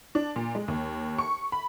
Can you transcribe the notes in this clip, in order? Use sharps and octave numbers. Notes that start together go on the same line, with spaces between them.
D4
A#2
G#3
D#2
C#6
B5